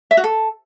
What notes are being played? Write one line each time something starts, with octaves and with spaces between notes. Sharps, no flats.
E5
F#4
A4